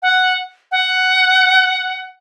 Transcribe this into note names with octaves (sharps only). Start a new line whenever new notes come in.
F#5
F#5